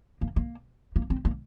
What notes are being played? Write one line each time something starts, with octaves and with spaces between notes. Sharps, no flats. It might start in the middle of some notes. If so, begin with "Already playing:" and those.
A#3
A#3
A#3
C4
A#3